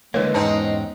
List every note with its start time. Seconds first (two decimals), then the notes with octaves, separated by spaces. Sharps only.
0.14 D3 E3 G#3 A#3 B4 C#5
0.34 E2 G#2 C4 C#4 D#4 A5